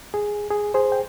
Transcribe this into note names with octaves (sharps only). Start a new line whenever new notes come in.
G#4
G#4
G#4 C5
G5